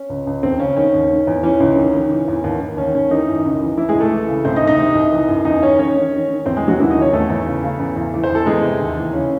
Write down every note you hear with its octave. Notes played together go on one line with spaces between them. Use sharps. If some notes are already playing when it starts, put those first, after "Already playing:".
Already playing: C#4
C#2
C#2
D#2 C4
C#3 C#4
D#3 C#4
D#2
D#3
E2
E3 C#4
C#2
D#3
D#3
E3
E2
D#2
D#2
D#2 C#4
D#2 C#4
D#3 E3 D#4
F#2
C#2
E3
E3 E4
G#3 G#4
C2
A3 A4
E3
C#3
C2 C4 C5
D#4 D#5
C2
D#4 D#5
C3
C2
E3
F#2
E2 D#4 D#5
D#3 C#4 C#5
D#3 C#4 C#5
D#3
D#3
D#3
E2 C4 C5
G#3 G#4
C3 F#3 F#4
D#2 E3 E4
D#4 D#5
D#2
C#4 C#5
E2 A3 A4
E2
C#3
C#3
E2
E2
E3
C5
E2 A4
E2 G#3 G#4
C3
D#2
E3
C#3 C#4